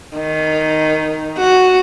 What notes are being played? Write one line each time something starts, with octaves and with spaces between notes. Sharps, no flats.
D#3
F#4